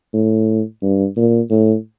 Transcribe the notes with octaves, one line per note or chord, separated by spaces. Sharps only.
A2
G2
A#2
A2